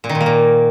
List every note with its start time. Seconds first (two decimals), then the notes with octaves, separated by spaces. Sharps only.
0.04 A#2
0.09 D#3
0.15 A#2
0.21 A#3
0.26 A#2